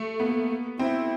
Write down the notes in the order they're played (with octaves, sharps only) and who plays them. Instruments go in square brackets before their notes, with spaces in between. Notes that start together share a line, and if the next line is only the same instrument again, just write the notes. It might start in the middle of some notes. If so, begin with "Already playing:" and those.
Already playing: [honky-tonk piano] A3
[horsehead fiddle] A#3 [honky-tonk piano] B3
[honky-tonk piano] C4 [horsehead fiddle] E4